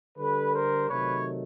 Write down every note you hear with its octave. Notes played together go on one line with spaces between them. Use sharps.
D3 G3 A4 B4
A#4 C5
C3 D#3 F#3 A3 B4 C#5